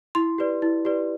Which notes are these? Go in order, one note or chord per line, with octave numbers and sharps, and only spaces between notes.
E4 C6
G4 B4 D5
E4
G4 B4 D5